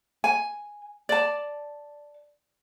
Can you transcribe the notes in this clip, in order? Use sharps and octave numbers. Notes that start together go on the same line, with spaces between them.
G#5
D5 A5